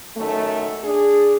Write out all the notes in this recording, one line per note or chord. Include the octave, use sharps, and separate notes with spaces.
F#2 D#3 A3
D4 G#4